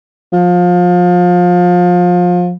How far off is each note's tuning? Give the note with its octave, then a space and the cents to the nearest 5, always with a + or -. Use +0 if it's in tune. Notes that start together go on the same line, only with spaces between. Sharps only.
F3 +25